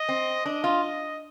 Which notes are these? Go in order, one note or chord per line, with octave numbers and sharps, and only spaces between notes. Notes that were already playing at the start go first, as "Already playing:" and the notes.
Already playing: D#5
C4
D4 D#5
F4